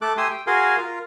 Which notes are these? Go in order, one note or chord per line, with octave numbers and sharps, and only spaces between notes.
A3 A4 D6 F#6
A3 G4 G#5 C6 D#6 E6
G5
F#4 G#4 A#4 F5 G#5 C6
F4 A#4